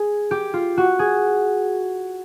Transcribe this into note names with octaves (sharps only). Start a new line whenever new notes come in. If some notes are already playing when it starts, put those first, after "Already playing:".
Already playing: G#4
G4
F4
F#4
G#4